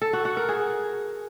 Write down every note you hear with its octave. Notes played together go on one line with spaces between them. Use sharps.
A4
F#4
F#4
A#4
G#4